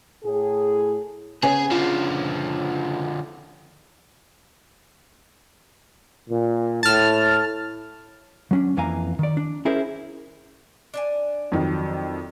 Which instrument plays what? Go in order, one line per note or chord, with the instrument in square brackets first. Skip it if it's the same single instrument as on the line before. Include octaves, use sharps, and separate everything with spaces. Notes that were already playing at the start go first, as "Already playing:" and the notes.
[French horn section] A2 G#4
[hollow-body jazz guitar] C#3 B3 [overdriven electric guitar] G#4 [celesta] C#5 G#5
[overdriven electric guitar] D3 F3 [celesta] F4
[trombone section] A#2
[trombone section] A2 [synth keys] A5 F6
[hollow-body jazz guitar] F#3 C#4 D4
F2 E3 A#3 F5 G#5 A#5
D#3 D5
D4
C#4 E4 G#4 A#4 C5
[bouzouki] D4 D5 G#5
[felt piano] F2 D#3 F#3